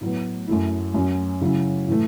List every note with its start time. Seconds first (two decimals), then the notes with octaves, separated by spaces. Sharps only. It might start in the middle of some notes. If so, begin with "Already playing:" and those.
0.01 A2 F#3 B3
0.48 F#2 F#3 A3 E4
0.94 F#2 F#3 C#4
1.41 C#3 F#3 C#4 E4
1.88 A2 E3 A3